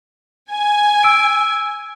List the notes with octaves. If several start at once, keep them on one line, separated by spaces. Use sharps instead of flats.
G#5
E6 D7